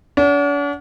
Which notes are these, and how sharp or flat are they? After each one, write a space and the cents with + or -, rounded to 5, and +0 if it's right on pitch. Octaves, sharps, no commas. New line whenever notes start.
D4 -45 F#5 +0